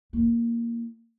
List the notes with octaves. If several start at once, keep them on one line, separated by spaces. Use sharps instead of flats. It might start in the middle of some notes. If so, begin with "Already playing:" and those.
A#3 E4